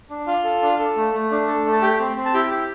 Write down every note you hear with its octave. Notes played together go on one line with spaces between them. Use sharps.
D4
F4 F5
A4
D4
A4
A3
A3
D4
A4
A3
A5
G4 G5
C4
C4
A5
E4 G4 G5
G4